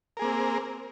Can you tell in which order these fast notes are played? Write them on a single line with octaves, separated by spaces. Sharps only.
A#4 G#4 A#3 C4